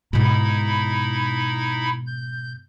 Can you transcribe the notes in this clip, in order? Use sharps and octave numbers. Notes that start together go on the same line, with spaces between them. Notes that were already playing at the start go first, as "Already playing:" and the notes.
G#2 B2 D#4 E4 B5
G6